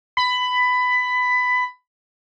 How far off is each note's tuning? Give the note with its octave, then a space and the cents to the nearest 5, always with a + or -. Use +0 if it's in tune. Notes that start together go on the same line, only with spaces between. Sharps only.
B5 +15